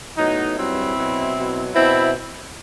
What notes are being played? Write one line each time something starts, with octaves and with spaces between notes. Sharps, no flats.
A2 F#3 B3 D#4
G2 F#3 C4 E4
B2 F#3
B2 F#3
B2 C4 E4